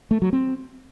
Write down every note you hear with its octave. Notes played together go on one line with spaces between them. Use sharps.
A3
F#3
C4